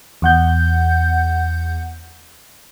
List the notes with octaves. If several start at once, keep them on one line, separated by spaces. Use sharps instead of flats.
E2 F#5 G6